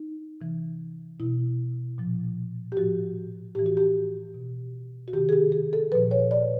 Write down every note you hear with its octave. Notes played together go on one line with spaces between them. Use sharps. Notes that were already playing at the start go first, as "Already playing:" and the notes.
Already playing: D#4
C3 E3
B2 E4
A#2 F3
G4
A2 F3 F#4
A2 E3 G4
F#4
G4
B2
F#4
C3 D#3 G4
G#4
G4
G#4
A4
A#2 F3 B4
C#5
D5